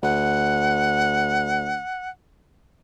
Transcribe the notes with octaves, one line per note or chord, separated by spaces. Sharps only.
D2 F#5